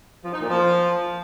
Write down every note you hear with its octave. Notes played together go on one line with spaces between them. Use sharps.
F3
D#4
A#2
F3